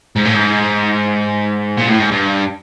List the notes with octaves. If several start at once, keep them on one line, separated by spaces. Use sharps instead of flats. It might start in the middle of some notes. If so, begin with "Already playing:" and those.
G#2
A2
G#2
A#2
A2
G#2
G2